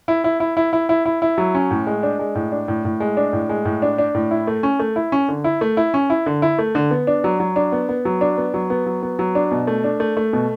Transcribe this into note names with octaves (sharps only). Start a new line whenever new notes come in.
E4
E4
E4
E4
E4
E4
E4
E4
F#3
C#4
A2
G#3
D4
G#3
A2
D4
A2
A2
G#3
D4
A2
G#3
A2
D4
D4
A2
E4
A3
C#4
A3
E4
C#4
D3
E4
A3
E4
C#4
E4
D3
E4
A3
D3
B3
D4
F#3
F#3
D4
B3
B3
F#3
D4
B3
F#3
B3
F#3
B3
F#3
D4
B2
A3
D4
A3
A3
B2